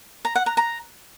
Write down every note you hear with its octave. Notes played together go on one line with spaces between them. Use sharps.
A#5
F#5
A#5
A#5